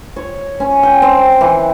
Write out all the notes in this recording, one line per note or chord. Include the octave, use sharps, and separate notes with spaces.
C#5
C#4
G5
C4
E3